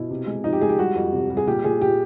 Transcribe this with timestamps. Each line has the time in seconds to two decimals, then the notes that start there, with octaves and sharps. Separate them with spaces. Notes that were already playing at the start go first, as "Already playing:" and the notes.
Already playing: B2 E4
0.10 C3
0.27 G#3
0.44 F3 D#4
0.53 G4
0.61 G#3 G#4
0.69 G4
0.78 G3 F#4
0.95 F2
1.12 C3
1.30 G3
1.37 G#4
1.47 A#2 G4
1.64 A#2 G#4
1.82 A#2 G4